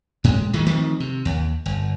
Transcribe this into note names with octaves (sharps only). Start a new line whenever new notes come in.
A2 G#3
D#3 E3 G#3 A3
D#3 F3 A3 C4
C3
D#2
G1